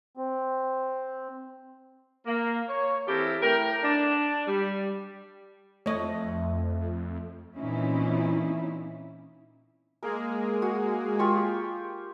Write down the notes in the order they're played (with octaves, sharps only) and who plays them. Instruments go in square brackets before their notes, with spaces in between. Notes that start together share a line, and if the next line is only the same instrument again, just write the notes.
[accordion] C4
[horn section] A#3
C#5
E3 C4 E4 G4 A4 A#4
A2 A#4 G5
D4
G3
[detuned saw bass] F2 [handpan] A3 [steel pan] C#5 D#5
[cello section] A#2 E3 C4 C#4 D#4 E4
[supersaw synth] G#3 A#3 G#4 [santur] A#4
[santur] F#4
F4 G4 C#6